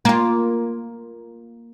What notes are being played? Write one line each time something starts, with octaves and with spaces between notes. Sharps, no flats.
A#3 F4